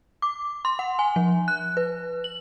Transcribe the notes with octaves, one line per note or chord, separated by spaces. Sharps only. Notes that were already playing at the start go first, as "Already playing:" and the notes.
D6
C6
F#5
G#5
F3
F#6
B4
F#7